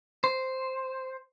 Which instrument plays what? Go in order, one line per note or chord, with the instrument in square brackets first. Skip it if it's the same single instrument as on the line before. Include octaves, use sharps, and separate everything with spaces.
[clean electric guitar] C5